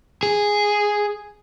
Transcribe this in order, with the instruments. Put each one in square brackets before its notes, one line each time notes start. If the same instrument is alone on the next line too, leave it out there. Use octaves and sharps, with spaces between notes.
[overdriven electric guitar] G#4